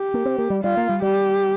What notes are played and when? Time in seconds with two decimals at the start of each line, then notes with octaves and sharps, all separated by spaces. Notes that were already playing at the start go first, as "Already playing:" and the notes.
Already playing: G4
0.14 A#3
0.25 C4
0.38 A#3
0.50 G3
0.63 G3 F4
0.77 A#3
0.89 G3
1.02 G3 G4